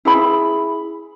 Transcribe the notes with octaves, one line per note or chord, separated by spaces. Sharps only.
E4 G#4 B5